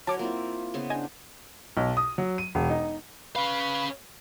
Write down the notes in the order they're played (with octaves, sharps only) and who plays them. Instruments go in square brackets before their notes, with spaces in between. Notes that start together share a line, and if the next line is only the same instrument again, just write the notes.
[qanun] F#3 [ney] C#5 [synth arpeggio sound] A5 D6
[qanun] A#3 C4 E4 [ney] F4
[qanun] C#3 B3 C5
[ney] D4 [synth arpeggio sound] D#5 G#5
[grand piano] B1
D#6
F#3
D#7
E1
D#4
[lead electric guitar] C#4 F5 [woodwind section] B4 B5